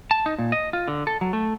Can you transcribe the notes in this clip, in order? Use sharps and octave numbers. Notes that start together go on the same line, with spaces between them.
A5
D#4
A#2
D#5
F4
D3
A4
F#3
A3